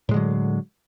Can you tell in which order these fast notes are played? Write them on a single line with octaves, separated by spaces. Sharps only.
A2 G#3 D3 F#3